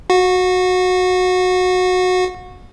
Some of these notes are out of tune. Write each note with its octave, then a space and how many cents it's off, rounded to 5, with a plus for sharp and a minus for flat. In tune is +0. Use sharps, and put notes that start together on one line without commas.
F#4 -10 F#5 -35